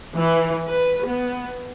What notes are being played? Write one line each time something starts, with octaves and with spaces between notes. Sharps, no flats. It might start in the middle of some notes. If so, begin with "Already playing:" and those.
E3
B4
B3